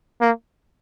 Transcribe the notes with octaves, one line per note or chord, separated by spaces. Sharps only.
A#3